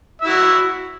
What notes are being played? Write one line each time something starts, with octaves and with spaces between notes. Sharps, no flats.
E4 F#4 E5